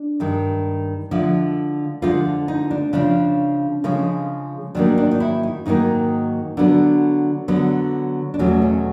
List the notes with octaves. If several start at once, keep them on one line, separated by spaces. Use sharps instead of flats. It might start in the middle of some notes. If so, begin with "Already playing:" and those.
Already playing: D4
G2 D#3 G#3
D3 F3 G#3 E4
D3 F3 G#3 F4
D#4
D4
C#3 F3 G#3 C#4 D4
C#3 F3 G#3 C#4
G#2 D#3 F#3 A#3 D4
D4
D#4
E4
D#4
G#2 D#3 F#3 A#3 D#4
D3 F#3 B3 D4
D3 F#3 B3
D4
E2 B2 F#3 A3 C#4
C#4